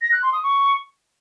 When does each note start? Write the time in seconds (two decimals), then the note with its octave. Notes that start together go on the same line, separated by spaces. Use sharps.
0.02 A#6
0.12 F#6
0.23 C6
0.33 D#6
0.43 C#6